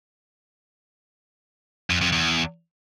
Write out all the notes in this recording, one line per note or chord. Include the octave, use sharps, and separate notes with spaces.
F2
F2
E2